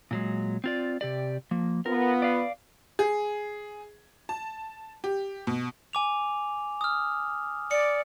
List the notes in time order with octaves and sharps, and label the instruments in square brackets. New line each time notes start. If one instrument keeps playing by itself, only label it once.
[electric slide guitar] A#2 F#3 G#3
C4 F4 D5
C3 G4 D5
F3 A#3
[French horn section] B3 F4 [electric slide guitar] A#4
[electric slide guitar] D5 F5
[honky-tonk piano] G#4
A5
G4
B2
[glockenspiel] G#5 D6 F7
D#6 F6
[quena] D5 [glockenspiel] C#7